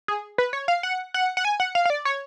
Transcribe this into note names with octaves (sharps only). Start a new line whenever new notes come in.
G#4
B4
C#5
F5
F#5
F#5
F#5
G#5
F#5
F5
F5
D5
C#5